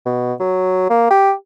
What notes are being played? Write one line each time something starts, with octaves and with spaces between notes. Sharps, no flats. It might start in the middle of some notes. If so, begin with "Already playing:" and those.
B2
F#3
A#3
G4